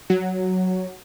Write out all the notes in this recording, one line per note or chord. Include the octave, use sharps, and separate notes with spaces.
F#3